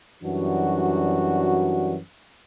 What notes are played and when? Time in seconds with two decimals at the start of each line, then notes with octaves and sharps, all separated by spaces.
0.23 F#2 E3 G3 D4 F#4